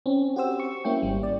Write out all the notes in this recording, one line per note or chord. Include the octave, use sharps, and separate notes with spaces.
C4 C#4
F#4 G4 C5 E6
C#6
A#3 C#4 E4 G5
G#1 G3
D5